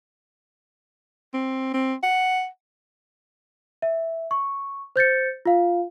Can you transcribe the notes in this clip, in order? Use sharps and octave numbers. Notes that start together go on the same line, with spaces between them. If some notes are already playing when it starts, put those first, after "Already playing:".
C4
C4
F#5
E5
C#6
C5 G6 A6 C#7
F4 F5